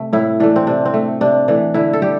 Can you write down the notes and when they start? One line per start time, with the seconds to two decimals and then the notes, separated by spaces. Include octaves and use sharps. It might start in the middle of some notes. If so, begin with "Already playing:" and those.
Already playing: C3 A3
0.13 A2 E4
0.40 E3 A3 D4
0.56 C4
0.67 C3 D4
0.85 C4
0.94 A3
1.21 C3 D4
1.48 E3 A3 D4
1.74 D3 E4
1.93 A4
2.02 G3 G4